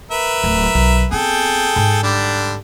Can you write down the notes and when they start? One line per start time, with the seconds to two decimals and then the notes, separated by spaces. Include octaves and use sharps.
0.11 A#4 B4 E5
0.44 D1
0.75 B1 D#3
1.11 B3 C4 G#4 A4 G5
1.76 G#2
2.03 D3 G3 D4